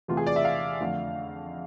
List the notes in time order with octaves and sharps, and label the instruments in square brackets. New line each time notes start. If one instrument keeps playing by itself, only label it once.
[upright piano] E2 C3 E3 A3 F4
G#4
D5
E5
F5
F2 D3 F3 A3